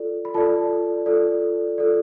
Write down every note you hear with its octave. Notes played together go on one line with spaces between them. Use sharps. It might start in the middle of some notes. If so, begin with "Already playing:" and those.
Already playing: F4 A4 D5
B5
F4 A4 D5 A5
F4 A4 D5
F4 A4 D5